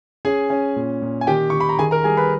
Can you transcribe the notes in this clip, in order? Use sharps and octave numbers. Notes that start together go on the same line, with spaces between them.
C#4 G#4 G#5
C#4
A#2
A#2
G#5
D#3 G4 G5
D#3 C#6
B5
A#5
D#3 G#4 G#5
A#4 A#5
G3 G#4 G#5
B4 B5